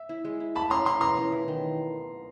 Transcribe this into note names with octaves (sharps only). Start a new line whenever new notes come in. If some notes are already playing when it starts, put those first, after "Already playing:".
Already playing: E5
E4
G#3
E4
E4 A5 B5
C#4 A#5 C6
E4 A#5 C6
E3 A#5 C6
C#4
E3
D#3